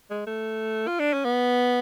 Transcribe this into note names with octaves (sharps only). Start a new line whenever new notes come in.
G#3
A3
F4
D4
C#4
B3